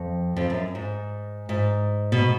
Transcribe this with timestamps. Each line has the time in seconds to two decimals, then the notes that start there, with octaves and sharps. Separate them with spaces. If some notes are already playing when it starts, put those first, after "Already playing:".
Already playing: F2
0.37 F2
0.50 F#2
0.75 G#2
1.49 G#2
2.12 B2